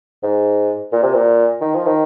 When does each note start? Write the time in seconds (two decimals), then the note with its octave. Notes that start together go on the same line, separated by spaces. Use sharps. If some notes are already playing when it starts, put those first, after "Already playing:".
0.23 G#2
0.92 A#2
1.03 C3
1.14 A#2
1.61 D#3
1.74 F3
1.86 D#3